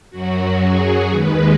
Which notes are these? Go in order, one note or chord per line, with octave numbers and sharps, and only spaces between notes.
F#2 F#3 F#4
G#4
D#2 D#3 G#3 B4